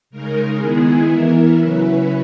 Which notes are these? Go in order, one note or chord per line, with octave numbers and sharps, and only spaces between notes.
C#3 G#3 D#4 A#4
D#3 G#3 B3 E4 G#4
E3 B3 E4 A#4
C#3 F#3 C#4 E4 B4